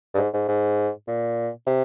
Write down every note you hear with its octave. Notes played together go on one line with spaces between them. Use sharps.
G2
G#2
G#2
G#2
A#2
C3